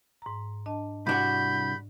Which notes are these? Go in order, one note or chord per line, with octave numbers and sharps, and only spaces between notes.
G#2 A#5
D4 D#5 A5
C2 G#2 D4 F#4 B5 G6